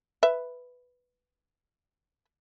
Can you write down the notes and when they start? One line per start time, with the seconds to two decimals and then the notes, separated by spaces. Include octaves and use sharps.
0.23 B4 E5